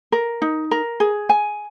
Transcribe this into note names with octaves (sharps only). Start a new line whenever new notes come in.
A#4
D#4
A#4
G#4
G#5